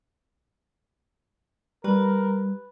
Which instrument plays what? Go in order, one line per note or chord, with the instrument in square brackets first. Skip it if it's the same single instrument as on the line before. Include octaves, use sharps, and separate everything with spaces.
[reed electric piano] G3 [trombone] A#4 [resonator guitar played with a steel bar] B4